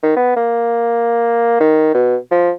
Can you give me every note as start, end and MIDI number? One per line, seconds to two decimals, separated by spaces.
0.03 0.15 51
0.16 0.32 59
0.36 1.58 58
1.60 1.93 51
1.94 2.16 47
2.31 2.51 53